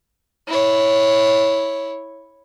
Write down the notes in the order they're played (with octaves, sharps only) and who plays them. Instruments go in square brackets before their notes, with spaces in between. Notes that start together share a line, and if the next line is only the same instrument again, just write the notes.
[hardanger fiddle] E4 C#5